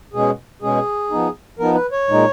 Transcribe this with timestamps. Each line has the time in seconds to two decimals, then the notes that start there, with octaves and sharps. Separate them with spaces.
0.14 B2 G#3 C#4 G#4
0.62 B2 G#3 C#4 G#4
1.11 F3 B3 D#4
1.59 F3 B3 D#4 A#4
1.75 B4
1.92 C#5
2.08 A#2 G#3 D#4